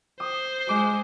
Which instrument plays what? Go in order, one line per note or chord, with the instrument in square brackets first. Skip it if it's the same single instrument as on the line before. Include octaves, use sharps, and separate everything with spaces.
[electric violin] C5 [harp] D#6
[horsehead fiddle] G#3 [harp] D6